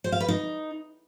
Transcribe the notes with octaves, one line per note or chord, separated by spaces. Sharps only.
C5
F5
B4
D#4